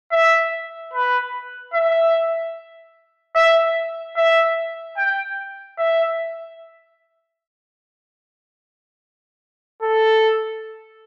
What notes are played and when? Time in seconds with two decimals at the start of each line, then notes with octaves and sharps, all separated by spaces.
0.12 E5
0.93 B4
1.74 E5
3.35 E5
4.16 E5
4.97 G5
5.78 E5
9.82 A4